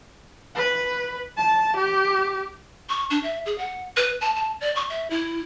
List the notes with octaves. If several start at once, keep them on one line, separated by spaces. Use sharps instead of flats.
B4
A5
G4
C#6
D4
E5
G#4
F#5
B4
A5
A5
D5
C#6
E5
E4